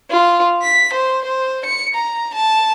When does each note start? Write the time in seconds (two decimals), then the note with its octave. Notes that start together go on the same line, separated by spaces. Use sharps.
0.10 F4
0.62 B6
0.93 C5
1.24 C5
1.65 C#7
1.94 A#5
2.34 A5